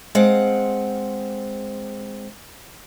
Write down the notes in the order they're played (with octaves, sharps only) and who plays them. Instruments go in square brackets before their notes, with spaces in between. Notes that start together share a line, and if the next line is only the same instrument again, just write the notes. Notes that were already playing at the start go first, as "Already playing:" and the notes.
[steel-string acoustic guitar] G#3 C4 F5 F#5